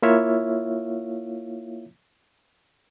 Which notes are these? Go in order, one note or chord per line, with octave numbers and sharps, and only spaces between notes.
A#3 E4 F4 C#5 E5 F5